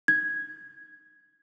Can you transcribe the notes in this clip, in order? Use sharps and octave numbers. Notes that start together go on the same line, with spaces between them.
G#6